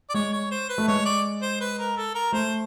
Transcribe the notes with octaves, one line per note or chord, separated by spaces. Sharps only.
D5
G#3 C#5
C#5
C5
B4
A3
G#3 C#5
D5
C5
B4
A#4
A4
A#4
A3 C5